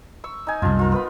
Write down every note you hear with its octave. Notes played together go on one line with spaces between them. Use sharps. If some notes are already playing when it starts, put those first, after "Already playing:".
C#6 E6
D#4 G#5
C2 F#2 F4 A5
F4 A#4
B3 B4 B5